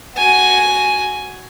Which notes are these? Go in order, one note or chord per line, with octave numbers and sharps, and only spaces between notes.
F#4 G#5